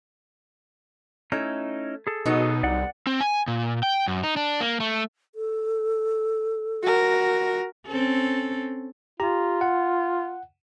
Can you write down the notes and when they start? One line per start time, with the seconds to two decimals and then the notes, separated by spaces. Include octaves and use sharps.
1.32 A3 C#4 D#4 E4
2.07 G#4 A4
2.26 B2 F#3 B3 D#4
2.63 C2 D5 F#5
3.07 C4
3.21 G#5
3.48 A#2
3.83 G5
4.08 F#2
4.24 D#4
4.37 D4
4.60 A#3
4.80 A3
5.35 A4
6.83 F#4 A#4
7.87 C4 C#4 A4
9.20 F4 G4 A#5
9.61 F#5